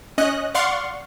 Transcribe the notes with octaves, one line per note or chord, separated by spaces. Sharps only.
C#4 D#5 F#6
D5 F5 F#5 C6 C#6